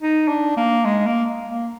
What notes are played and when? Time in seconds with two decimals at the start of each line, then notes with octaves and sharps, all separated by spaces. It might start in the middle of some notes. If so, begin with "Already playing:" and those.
0.01 D#4
0.28 D4
0.57 A#3
0.85 G#3
1.06 A#3
1.49 A#3